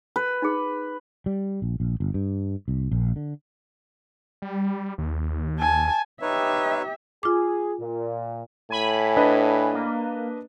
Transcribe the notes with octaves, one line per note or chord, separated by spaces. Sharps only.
B4
D#4 G#4
G3
A#1
A#1
G1
G2
C2
A#1
D3
G3
D#2
G#5 A5
D#4 G4 B4 C#5 E5
F4 G#4 D6
A#2
A2 G#5 B5
D4 B4 D#5
A#3